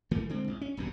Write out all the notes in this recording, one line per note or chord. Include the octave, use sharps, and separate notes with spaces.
G1 E3 A3 A#3
D3 G#3 C4
A1
C#4
D#1 B1 F#2 D3